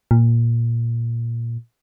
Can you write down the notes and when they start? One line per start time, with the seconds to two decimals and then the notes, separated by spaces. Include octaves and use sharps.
0.11 A#2